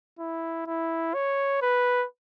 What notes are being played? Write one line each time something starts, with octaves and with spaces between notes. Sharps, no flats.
E4
E4
C#5
B4